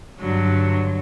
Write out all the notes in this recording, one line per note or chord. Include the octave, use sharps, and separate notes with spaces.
G2 D3 F#3